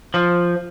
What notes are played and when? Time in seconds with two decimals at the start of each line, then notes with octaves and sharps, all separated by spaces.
0.14 F3